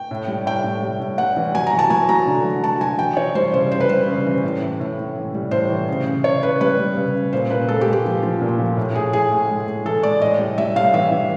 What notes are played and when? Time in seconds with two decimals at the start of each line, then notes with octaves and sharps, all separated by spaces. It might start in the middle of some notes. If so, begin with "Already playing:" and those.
Already playing: G5
0.11 A2
0.28 G3
0.46 A2 G5
0.64 A2
0.82 G3
1.00 A2
1.18 G3 F#5
1.36 E3
1.54 F#3 G#5
1.67 A#5
1.73 F#3
1.79 A5
1.90 F#3 G#5
2.09 F#3 A#5
2.27 D3
2.45 F#3
2.63 F#3 A5
2.81 F#3 G#5
2.99 E3 G5
3.17 E3 C#5
3.35 G3 C5
3.53 C#3 C5
3.71 C#3 C5
3.80 B4
3.89 G3 C5
4.07 C#3
4.26 E3
4.43 A2
4.62 A2
4.80 A2
4.98 A2
5.16 E3
5.35 G3
5.51 A2 C5
5.70 E3
5.89 C#3
6.06 C#3
6.24 C#3 C#5
6.42 C#3 B4
6.61 G3 B4
6.79 G3
6.97 C#3
7.14 C#3
7.33 A#2 C5
7.50 A#2 B4
7.69 G#3 A4
7.81 G4
7.86 G#3
7.93 G4
8.05 F3
8.23 F3
8.41 A#2
8.59 F3
8.77 A2
8.95 A2 G#4
9.13 A2 G#4
9.31 A2
9.49 G#3
9.67 G#3
9.85 E3 A4
10.03 G#3 D5
10.22 A2 D#5
10.39 G3
10.58 G3 E5
10.76 A2 F5
10.93 E3 E5
11.12 E3